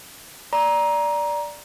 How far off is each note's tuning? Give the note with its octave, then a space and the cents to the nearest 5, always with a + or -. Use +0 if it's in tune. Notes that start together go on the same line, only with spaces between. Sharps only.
D5 +0 A#5 +15